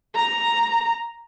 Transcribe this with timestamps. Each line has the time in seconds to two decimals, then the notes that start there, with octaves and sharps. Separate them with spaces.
0.15 A#5